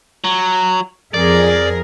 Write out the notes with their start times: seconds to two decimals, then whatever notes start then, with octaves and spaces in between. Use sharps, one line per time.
0.24 F#3
1.14 F2 G#4 A#4 D5